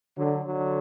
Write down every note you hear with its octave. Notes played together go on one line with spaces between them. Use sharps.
D3 F#3
D3 F#3